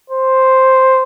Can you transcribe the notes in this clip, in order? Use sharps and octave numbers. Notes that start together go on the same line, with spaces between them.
C5